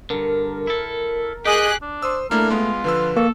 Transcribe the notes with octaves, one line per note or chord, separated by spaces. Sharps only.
G2 D3 A#4
E4 A4
G4 G#4 D#5 F#6
D4
C5 C6 D#6 E6
A3 A#3 D4 E4 A#4
G#3 B3 F4
D3 F3 B4 E6
A#3 A4 C#6